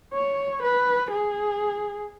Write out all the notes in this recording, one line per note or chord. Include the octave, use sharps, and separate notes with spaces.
C#5
B4
G#4